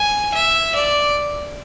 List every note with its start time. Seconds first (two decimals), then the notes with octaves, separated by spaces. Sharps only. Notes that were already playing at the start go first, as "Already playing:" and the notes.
Already playing: G#5
0.34 E5
0.75 D5